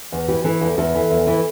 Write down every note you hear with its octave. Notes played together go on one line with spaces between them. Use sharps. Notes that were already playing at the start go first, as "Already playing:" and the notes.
E2
E3 G4
E3 A4
E2
E2 A4
E3
E2
E3